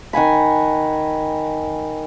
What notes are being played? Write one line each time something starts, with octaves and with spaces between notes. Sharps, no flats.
D#3 F#5 G#5 B5